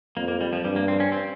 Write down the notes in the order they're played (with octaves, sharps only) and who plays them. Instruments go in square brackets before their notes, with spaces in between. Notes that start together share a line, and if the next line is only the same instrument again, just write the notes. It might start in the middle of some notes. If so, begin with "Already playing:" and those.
[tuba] F2 [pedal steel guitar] A#3
[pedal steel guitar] A#3
G3
F3
[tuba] G2 [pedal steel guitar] G3
[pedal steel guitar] A#3
C4
C#4
C4